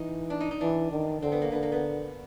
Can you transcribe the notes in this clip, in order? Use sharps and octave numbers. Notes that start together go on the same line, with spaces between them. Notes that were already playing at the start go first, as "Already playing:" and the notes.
Already playing: E3 D#4
D4
D#4
D#4
E3 D4
D#3
D3 C4
B3
A#3
D3 B3
A#3
B3